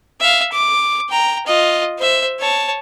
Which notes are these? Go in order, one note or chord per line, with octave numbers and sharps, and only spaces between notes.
E5 F5
D6
G5 A#5
F4 D#5
C5 E5
C#5 A5